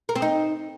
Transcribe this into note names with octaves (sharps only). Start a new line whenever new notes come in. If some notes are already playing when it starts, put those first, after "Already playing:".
A#4
C4
D#4